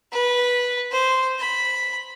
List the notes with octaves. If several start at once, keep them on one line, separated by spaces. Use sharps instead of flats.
B4
C5
B5